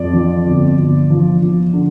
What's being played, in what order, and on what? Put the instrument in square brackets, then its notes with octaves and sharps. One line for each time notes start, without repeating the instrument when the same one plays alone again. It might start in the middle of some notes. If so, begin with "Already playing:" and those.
Already playing: [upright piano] F2 D5
F3
G1
G1
F3
F3
D3